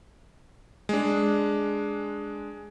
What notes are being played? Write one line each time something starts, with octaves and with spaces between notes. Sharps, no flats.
G#3 D4